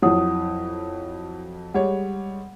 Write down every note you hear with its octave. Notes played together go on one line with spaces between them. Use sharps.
F2 F#3 E4 F#5 D#6
G3 G#3 C#5 F#5